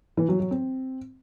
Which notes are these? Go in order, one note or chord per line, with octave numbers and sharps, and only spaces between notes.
E3
F#3
F#3
C4